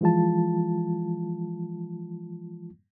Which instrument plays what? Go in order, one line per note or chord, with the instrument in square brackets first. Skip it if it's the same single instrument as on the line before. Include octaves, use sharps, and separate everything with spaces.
[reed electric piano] E3 F3 G#3 F4 A5